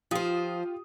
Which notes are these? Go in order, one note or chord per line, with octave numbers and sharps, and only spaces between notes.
F3 F4 G4 C5 D#6